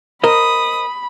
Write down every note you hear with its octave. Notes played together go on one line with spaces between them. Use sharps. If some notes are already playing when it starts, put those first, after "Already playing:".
A#4 C5 D#5 B5 D#6